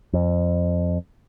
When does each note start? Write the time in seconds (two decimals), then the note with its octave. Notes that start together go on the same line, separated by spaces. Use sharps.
0.13 F2